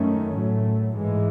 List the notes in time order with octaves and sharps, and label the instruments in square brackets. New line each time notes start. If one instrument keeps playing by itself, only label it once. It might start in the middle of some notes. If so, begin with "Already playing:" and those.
Already playing: [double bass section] F#2 D#3 A3 C#4
A2 F#3 A3
G#2 E3 G#3